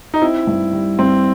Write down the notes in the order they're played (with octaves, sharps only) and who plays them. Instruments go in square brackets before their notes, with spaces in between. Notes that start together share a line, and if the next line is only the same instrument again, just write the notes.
[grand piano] D#4
[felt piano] C4 [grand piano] E4
[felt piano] G2
G3
[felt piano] G2 [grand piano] C4